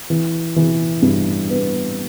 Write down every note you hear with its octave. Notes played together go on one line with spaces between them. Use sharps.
E3
E3
G2
B3